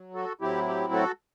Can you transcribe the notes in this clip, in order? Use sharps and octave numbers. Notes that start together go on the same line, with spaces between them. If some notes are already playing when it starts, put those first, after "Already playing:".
Already playing: F#3
F#4 A4
A2 F#3 C4 E4 G4
G4
F#4 A4